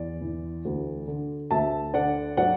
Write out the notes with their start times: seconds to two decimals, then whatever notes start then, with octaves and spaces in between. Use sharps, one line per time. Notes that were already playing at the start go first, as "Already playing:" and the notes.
Already playing: E2 D5
0.21 E3
0.65 D2
1.08 D3
1.51 D2 E5 A5
1.94 D3 D5 F#5
2.37 F#3 D5 F#5